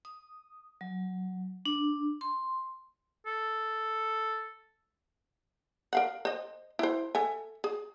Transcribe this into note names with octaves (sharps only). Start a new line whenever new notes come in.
D#6
F#3
D4
C6
A4
A#4 F5 F#5
C5 D#5
E4 C5
A4 E5 G#5
G#4